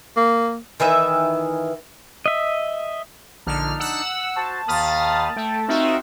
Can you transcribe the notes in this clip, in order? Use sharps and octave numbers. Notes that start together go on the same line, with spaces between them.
A#3
D#3 E3 B4 E5
D#5 E5
A#1 D3 D4 D#4 F6
F#5 E6
F#4 C5 A5
D#2 D#3 F5 B5 D#6 F6 A6
A3 G5
C4 D#4 F4 F#4 A#4 D#5 E5